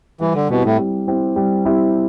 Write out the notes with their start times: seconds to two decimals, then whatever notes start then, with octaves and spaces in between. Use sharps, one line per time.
0.21 E3 G3
0.35 D3
0.50 B2 C4 E4 G4
0.64 A2
0.79 G3
1.08 C4 E4 G4
1.36 G3
1.65 C4 E4 G4